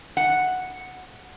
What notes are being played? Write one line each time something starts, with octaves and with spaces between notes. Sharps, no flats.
F#5